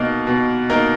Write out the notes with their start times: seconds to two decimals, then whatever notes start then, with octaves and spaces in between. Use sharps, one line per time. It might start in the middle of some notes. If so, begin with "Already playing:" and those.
Already playing: B2 A#3 D#4 A#4
0.27 B2
0.70 A#3 D#4 A#4